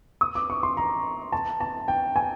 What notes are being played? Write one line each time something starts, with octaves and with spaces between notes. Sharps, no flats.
D#6
D6
C#6
C6
A#5
A5
A5
G5
G#5